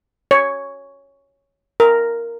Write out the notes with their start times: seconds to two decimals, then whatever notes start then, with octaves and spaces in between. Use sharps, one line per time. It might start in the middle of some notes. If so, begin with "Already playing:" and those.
0.31 C#5
1.80 A#4